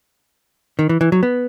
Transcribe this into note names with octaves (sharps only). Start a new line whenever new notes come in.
D#3
E3
E3
F#3
B3